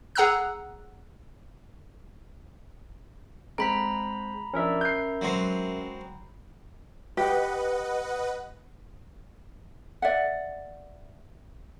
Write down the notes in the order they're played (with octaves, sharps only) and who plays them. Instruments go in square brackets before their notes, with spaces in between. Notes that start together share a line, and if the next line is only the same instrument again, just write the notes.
[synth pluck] G#4 F#5 A#5 E6 F#6
[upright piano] G#3 C4 D7 [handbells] A#5 B5 B6
[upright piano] F3 D4 [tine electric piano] C#4 A#4 E5
[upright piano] G6 C7
[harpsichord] F#3 G#3 C4
[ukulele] G4 [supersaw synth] B4 D#5 F#5
[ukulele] D5 E5 F#5